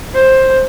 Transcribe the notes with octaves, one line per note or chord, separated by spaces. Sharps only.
C5